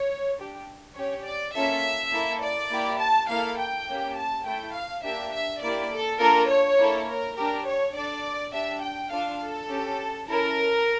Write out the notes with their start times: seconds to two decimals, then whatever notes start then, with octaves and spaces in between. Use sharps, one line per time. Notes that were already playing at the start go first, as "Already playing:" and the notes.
Already playing: C#5
0.38 D4 G4
0.96 C#4 G4 C#5
1.25 D5
1.54 A#3 C#4 F4 A4 E5
2.13 A#3 E4 A4
2.42 D5
2.71 A#3 E4 G4
3.00 A5
3.29 A#3 E4 A4 F5
3.58 G5
3.88 A#3 C#4 G4
4.16 A5
4.46 A3 E4 A4 G5
4.75 F5
5.04 A#3 D4 G4 E5
5.32 E5
5.61 A#3 E4 G4 D5
5.91 A4
6.20 A#3 D4 F4 A4 A#4
6.49 C#5
6.78 A#3 E4 A4
7.08 A#4
7.37 D4 G4 A#4
7.66 C#5
7.95 D4 A4 D5
8.53 D4 G4 E5
8.82 G5
9.11 D4 F4 A4 F5
9.40 A4
9.70 C#4 G4
10.28 C#4 E4 A4 A#4